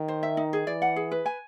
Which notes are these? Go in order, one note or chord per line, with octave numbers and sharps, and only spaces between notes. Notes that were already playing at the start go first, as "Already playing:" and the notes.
Already playing: D#3
C5
E5
D#4
G#4
E3 D5
F#5
G#4
B4
G#5